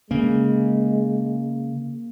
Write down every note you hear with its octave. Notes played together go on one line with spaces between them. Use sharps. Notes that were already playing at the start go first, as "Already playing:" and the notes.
C#3 G#3 A#3